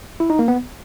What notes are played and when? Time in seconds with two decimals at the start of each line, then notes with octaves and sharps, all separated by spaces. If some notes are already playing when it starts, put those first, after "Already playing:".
0.20 E4
0.30 D#4
0.39 A#3
0.48 B3